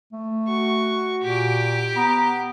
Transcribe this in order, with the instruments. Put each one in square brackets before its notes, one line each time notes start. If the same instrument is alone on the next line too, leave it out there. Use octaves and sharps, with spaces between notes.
[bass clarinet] A3
[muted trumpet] F#4 [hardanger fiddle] C#6
[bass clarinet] A#2 [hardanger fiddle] G4 D6
[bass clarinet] B3 [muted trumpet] A#5